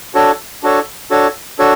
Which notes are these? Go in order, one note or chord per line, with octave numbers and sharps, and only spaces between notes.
D4 F#4 A4 C#5
D4 F#4 A4 C#5
D4 F#4 A4 C#5
D4 F#4 A4 C#5